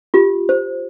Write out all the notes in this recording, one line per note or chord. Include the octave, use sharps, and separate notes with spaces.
F4 G4
C5